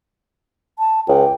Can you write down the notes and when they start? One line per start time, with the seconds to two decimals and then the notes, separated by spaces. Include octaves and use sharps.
0.79 A5
1.08 C#2 G5